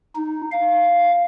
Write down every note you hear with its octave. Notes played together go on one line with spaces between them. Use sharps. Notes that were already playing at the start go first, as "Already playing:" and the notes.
D#4
F5